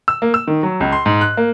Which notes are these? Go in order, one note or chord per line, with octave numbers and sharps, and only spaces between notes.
E6
A#3
E6
D#3
F#3
C#2
C6
G#2
F#6
A#3